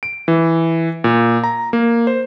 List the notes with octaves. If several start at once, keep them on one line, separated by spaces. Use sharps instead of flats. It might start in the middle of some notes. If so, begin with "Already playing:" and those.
D7
E3
A#2
A#5
A#3
C5